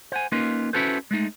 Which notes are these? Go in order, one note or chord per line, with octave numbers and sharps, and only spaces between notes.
C5 F#5 G#5
A#3 C#4 D#4 F4 A#4 B4
C#4 E4 F#4 A4 B4 C5
G#3 A3 D#4